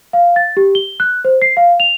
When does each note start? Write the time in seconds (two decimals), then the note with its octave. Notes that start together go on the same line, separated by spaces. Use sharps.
0.13 F5
0.36 A6
0.57 G4
0.75 G7
1.00 F#6
1.25 C5
1.42 C7
1.57 F5
1.80 F7